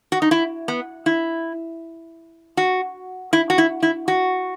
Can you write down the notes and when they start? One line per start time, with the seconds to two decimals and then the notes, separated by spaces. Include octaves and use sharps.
0.12 F#4
0.22 D#4
0.31 E4
0.68 B3
1.06 E4
2.57 F#4
3.33 E4
3.50 F#4
3.58 E4
3.83 E4
4.08 F#4